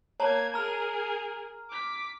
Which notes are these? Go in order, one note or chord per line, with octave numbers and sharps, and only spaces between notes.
A#3 C#5 A5 A#5 G#6
G#4 A#4 A#5 F6
D6 B6